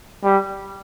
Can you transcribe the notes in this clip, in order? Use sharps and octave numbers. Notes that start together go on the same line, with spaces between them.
G3